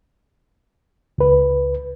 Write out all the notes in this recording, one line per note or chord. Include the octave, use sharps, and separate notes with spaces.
C#2 B4